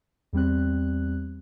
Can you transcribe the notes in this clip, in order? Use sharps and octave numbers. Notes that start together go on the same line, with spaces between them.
E2 G3 C4 F#6